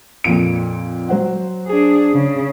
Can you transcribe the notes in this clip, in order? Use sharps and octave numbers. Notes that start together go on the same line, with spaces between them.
F2 A#2 D7
F#3 C5 F#5
D4 G#4
C#3